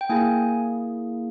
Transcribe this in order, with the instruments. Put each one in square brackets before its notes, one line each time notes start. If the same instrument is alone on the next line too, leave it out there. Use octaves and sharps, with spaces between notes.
[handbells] G5
A#3 E4 G#4 G#5